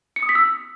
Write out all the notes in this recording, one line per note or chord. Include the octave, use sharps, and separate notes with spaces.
C#7
D#6
B6
E6